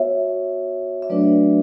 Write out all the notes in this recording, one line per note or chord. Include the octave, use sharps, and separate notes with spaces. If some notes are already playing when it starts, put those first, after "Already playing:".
Already playing: B3 F#4 C#5 E5
E5
F#3 A3 D4 F#4 B4 D5